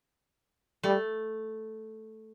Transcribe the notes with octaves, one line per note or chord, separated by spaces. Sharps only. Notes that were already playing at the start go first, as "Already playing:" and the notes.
G3 A3